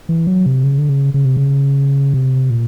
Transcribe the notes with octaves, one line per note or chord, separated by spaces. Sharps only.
E3
F#3
C3
C#3
D3
C#3
C#3
C3
C#3
C3
A#2